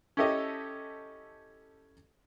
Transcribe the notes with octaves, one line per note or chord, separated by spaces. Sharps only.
C#4 E4 G4 A4 D#5